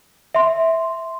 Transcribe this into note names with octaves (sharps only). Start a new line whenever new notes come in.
E5 C6